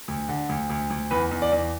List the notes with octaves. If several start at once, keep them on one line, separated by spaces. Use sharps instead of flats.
D2
D3
D2
D2
D2
E2 B4
E2
D5
E2